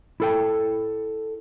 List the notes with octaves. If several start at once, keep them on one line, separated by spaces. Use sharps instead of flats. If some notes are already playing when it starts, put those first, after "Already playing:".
E4 A4 G5